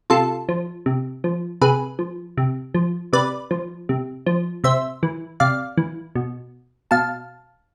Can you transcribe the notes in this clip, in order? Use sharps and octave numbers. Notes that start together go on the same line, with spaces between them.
C3 F4 A4
F3
C3
F3
C3 G#4 B4
F3
C3
F3
C3 B4 D5
F3
C3
F3
C3 C5 E5
E3
C3 D5 F5
E3
B2
B2 F5 A5